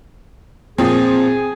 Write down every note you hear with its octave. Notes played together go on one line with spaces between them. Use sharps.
A#2 F3 C4 G#4